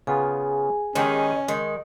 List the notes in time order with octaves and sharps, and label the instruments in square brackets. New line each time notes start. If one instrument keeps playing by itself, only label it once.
[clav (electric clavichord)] C#3 B3 F4 [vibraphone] G#4 G#5
[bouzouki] D#3 B3 D#4 [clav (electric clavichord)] G#3 G4 A#4 [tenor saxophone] C#4
[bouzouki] D#3 [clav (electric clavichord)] G#3